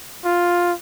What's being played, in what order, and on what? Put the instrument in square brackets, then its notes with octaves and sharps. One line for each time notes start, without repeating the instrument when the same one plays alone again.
[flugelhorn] F4